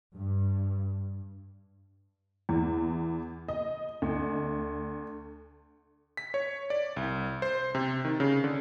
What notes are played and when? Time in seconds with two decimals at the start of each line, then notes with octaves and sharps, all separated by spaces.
0.15 G2
2.49 E2
3.48 D#5
4.02 D2
6.17 B6
6.34 C#5
6.70 D5
6.97 C2
7.42 C5
7.75 C3
8.05 D#3
8.20 C#3
8.44 D3